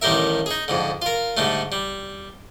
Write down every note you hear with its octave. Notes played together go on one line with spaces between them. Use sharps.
A1 D#3 G3 G4 A#4 E5
D#4 G#4
F2 G#2 D3
F4 A#4
G#2 D3 G3 A3
G3